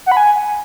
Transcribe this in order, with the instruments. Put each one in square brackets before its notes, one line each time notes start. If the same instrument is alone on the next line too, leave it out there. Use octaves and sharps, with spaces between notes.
[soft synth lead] F#5
B5
G#5